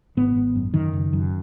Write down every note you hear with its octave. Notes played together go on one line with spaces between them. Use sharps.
G#1 B3
G#1
F#2
F#2 D#3
F#1
F#2